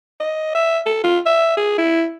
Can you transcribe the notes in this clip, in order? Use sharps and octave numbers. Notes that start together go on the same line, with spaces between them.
D#5
E5
A4
F4
E5
G#4
E4